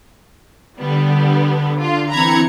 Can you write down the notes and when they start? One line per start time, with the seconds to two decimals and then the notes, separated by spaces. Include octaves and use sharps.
0.79 D3 G3 B3
1.81 F4
2.12 E3 C4 A#5 B5 G#6 C#7